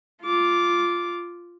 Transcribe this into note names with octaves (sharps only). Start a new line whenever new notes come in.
F4 D6